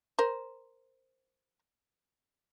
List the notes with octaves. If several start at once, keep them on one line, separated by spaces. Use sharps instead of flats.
A#4 C5